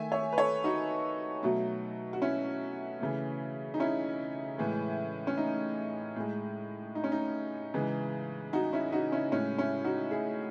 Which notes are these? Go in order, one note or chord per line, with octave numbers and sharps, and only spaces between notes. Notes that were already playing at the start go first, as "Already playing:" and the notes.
Already playing: D#3 A3 E5 G#5
C#5 E5
B4
A4 C#5
D#4 F#4
B2 F#3 A3
F#4
C#4 E4
C#3 E3 A3
D#4
C#4 E4
A2 E3 G#3
C#4
D#4
A2 G#3
D#4
C#4
D#4
C#3 E3 G#3
D#4 F#4
C#4 E4
D#4 F#4
C#4 E4
A2 G#3 C#4
C#4 E4
D#4 F#4
E4 G#4